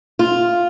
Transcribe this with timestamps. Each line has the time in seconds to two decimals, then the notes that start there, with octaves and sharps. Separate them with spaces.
0.19 F4